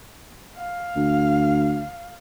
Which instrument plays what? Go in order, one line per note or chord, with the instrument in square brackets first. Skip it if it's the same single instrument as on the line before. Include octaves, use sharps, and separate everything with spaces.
[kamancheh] F5
[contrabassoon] D2